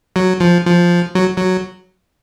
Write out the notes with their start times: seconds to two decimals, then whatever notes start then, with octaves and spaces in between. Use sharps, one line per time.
0.16 F#3
0.40 F3
0.66 F3
1.15 F#3
1.36 F#3